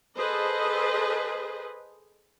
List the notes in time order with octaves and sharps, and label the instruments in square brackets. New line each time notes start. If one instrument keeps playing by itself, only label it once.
[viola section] G#4 A4 B4 C5 D#5